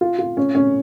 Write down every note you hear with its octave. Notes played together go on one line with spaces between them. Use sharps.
F4
F4
C#4
C#4